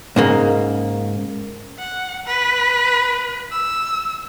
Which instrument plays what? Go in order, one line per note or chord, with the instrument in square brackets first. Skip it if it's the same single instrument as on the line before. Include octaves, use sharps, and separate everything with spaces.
[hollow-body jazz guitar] G#2 C#3 A#3
[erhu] F#5
B4
E6